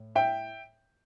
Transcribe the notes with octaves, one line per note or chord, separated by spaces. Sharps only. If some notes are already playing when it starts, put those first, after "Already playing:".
Already playing: A2
E5 G5